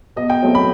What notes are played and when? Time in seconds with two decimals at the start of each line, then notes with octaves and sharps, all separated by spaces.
0.16 B2 D#5
0.30 G5
0.42 F#3 A3 C4
0.55 B5